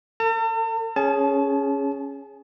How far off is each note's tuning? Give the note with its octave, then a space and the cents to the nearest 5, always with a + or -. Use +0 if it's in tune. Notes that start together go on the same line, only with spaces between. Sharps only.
A4 +45 A5 +45
C#4 +0 G#4 +0 A5 -30